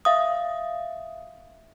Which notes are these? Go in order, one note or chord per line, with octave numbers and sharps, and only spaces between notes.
E5 F5 D#6